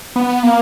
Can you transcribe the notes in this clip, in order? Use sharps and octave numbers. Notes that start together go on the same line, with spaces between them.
B3
A#3